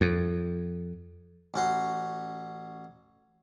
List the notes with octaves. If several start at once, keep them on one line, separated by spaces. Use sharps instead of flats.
F2
A1 C#4 F#4 C6